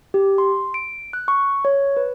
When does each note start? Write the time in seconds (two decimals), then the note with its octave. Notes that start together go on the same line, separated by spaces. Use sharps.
0.14 G4
0.38 C6
0.74 D7
1.13 F#6
1.28 C#6
1.65 C#5
1.97 B4